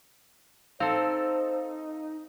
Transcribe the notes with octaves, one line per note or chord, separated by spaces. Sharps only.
C4 D#4 A4 C5 F5